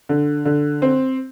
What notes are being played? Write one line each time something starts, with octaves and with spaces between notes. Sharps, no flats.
D3
D3
C4